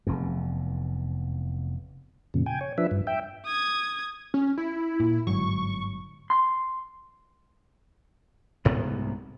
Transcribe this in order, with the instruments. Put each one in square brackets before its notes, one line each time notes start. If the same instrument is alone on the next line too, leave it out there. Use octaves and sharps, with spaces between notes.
[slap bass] F1 E2
[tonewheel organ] F2 A#2 C#3
G5 G#5
C#5
F3 D4 B4 E5
G2
E5 G5
[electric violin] D#6 G#6
[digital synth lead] C#4
E4
[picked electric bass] A#2
[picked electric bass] G1 G#2 F#3 [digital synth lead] C#6
[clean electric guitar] C6
[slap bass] C2 G#2 C3 B3